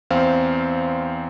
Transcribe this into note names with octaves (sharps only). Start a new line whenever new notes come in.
E2 C4 C5 F5